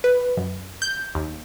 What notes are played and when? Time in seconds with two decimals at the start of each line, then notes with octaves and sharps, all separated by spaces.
0.04 B4
0.37 F#2
0.82 G6
1.15 D#2